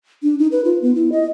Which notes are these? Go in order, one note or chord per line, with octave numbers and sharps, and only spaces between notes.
D4
D#4
B4
F4
B3
E4
D#5